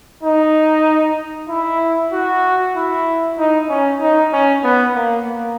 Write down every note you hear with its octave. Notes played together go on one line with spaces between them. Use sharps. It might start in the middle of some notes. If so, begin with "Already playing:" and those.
D#4
E4
F#4
E4
D#4
C#4
D#4
C#4
B3
A#3
A#3